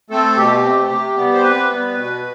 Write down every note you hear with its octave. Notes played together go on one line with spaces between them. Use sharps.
A3 C4 A4
B2 G4
A3 C4
C3
G3 B3
C5
C3 B4
G3 B3
B2